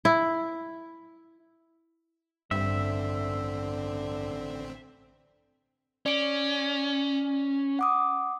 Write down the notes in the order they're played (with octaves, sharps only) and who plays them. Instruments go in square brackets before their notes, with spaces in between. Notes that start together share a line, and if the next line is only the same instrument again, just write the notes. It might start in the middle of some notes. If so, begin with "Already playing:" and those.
[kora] E4
[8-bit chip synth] A1 C4 [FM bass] G2 [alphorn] D3 [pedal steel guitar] E5
[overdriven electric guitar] C#4 [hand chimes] D5 D7
[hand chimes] F#5 D6 D#6